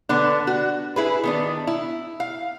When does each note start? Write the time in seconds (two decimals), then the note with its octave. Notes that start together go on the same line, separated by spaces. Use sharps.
0.09 D3 B3 D4
0.47 F#4
0.96 E4 G#4 B4
1.24 D#3 B3 D4
1.67 E4
2.20 F5